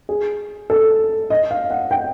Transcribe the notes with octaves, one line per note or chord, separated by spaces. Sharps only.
G#4
A4
D#5
F5
F#5
G5